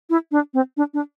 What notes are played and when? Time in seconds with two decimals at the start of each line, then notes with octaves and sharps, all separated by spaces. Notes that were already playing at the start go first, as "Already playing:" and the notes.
0.10 E4
0.32 D4
0.54 C4
0.77 D4
0.94 D4